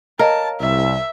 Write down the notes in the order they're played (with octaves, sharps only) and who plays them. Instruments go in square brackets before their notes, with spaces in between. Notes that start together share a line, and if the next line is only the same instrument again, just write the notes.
[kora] A#4 [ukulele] C#5 D#5 F5 [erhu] A5
[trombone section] C2 [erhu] E5